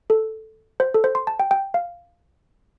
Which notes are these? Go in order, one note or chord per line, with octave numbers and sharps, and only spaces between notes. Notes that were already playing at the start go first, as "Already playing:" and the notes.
A4
C5
A4
C5
C6
A5
G5
G5
F5